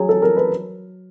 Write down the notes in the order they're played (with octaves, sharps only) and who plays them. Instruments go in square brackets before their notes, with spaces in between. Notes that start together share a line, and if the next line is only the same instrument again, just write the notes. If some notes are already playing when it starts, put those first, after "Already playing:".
Already playing: [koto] F#3 [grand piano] G#4
[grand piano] A4
A#4
B4